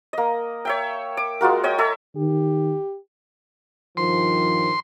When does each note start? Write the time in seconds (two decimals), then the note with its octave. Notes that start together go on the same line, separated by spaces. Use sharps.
0.13 A#3 D#5
0.65 C#5 E5 G5
1.17 D6
1.41 G#3 F4 F#4 A#4
1.64 C#5 D#5 G5
1.78 A4 C#5 E5
2.16 D#3 G4
3.97 G2 D#3 F3 C6